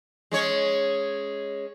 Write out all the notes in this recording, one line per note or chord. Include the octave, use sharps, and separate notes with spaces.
G#3 C#4 C#5